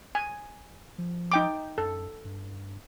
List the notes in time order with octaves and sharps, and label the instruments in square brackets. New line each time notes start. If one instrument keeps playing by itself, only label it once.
[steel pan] G#5
[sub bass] F3
[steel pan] D#4 G5 D6
[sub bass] F#2 [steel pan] A4
[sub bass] G2